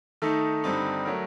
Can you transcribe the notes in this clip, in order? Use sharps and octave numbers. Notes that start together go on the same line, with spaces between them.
D#3 A3 D#4 A4
G2 D3 G3 C4 D#4
F#3 A3 A#4